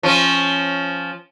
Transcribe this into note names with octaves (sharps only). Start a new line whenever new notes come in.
F3 C#4